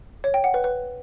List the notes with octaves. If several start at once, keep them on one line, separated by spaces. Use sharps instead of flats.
C#5
G5
F#5
B4
B4